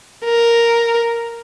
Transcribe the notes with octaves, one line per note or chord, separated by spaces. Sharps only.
A#4